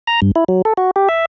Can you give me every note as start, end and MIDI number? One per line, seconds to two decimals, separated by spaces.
0.07 0.20 82
0.22 0.31 43
0.36 0.44 64
0.48 0.62 54
0.65 0.73 69
0.77 0.91 66
0.96 1.09 67
1.09 1.25 76